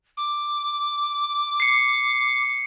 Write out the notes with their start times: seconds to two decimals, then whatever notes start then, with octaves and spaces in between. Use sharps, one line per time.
0.17 D6
1.60 C7 C#7